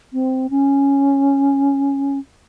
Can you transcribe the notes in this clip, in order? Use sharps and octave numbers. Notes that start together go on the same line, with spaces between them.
C4
C#4